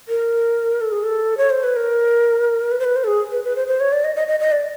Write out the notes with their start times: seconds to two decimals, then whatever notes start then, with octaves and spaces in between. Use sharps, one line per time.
0.08 A#4
0.81 A4
0.92 G#4
1.03 A4
1.37 C#5
1.50 C5
1.63 B4
1.76 A#4
2.71 B4
2.79 C5
2.84 B4
2.96 C5
3.04 A4
3.07 G#4
3.32 B4
3.44 B4
3.56 C5
3.68 C5
3.80 C#5
3.92 D5
4.04 D#5
4.16 D#5
4.28 D#5
4.40 D#5
4.52 D5